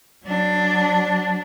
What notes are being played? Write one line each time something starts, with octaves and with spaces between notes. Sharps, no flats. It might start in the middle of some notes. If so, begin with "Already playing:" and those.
F#3 D4